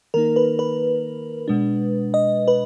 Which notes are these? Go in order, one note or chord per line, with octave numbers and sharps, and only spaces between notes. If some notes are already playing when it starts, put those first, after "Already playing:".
D#3 A#3 D#4 A#4
B4
B4
B2 G#3 D4
D#5
B4